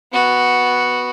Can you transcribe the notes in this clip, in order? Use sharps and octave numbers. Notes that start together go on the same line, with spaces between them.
B3 F#4